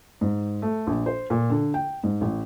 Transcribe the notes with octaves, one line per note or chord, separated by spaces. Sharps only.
G#2
A3
A#1
C5
A#2
D3
G5
G#2
A1